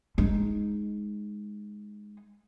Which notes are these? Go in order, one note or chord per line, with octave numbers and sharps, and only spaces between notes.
G#3 D#4